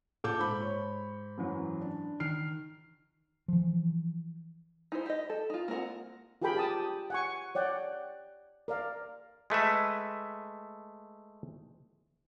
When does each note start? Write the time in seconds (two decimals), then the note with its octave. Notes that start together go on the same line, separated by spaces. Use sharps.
0.24 A#2 A4 D6 G6
0.39 G#2 B5
0.61 C#5
1.38 F#2 E3 F#3
1.81 D4
2.20 D#3 F6 C7
3.48 E3 F3
4.92 D#4 E4 C5
5.06 G4 D#5
5.30 A4
5.50 D#4 F4
5.68 A#3 C4 A#4 F#5
6.42 F4 G4 G#4 A#4 G5 B5
6.55 G4 A5 D#6
7.10 F#5 G#5 C#6
7.55 C#5 D5 F#5 G5
8.68 A#4 D5 F5
9.50 G#3 A3 B4 E5